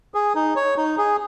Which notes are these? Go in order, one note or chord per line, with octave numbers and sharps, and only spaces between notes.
G#4
D#4
C#5
D#4
G#4